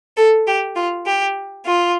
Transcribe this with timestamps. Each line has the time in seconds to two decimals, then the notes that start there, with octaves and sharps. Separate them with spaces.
0.17 A4
0.46 G4
0.75 F4
1.05 G4
1.64 F4